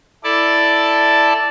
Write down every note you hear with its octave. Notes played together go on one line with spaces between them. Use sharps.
E4 A4 D5 A5